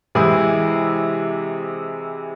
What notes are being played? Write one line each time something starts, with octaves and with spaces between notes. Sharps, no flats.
C3 E3 G#3 E4 G#4